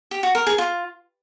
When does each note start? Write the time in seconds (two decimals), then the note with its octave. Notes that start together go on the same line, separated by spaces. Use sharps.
0.11 G4
0.23 F#4
0.35 A#4
0.47 G#4
0.58 F4